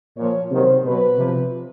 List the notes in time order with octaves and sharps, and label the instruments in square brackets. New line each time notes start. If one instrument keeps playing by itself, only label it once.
[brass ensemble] A#2 F3 C#5
C3 D#3 F#3 C5
B2 F#3 B4
C3 F3